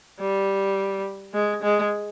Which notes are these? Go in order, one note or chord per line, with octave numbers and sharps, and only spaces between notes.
G3
G#3
G#3